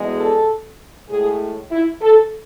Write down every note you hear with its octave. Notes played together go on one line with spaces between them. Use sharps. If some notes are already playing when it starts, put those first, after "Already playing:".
Already playing: E2 B2 G#3
A4
A2 G#3 G#4
E4
A4